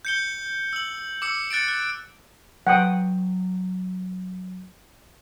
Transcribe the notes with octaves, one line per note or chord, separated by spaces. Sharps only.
G6 C#7 G7
E6 F#7
D6 E6 C#7
F#6 A6 C#7 D7
F#6
F#3 F#5 G5 D#6